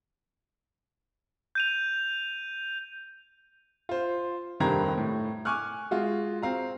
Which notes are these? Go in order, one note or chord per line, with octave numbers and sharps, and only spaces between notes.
G6 D#7 F7
F4 C5
F1 G2 D#3 C4 A#5 G#6
A2
G#5 C#6 D6 F6 F#6
G#3 F4 F#4
C4 F5 A#5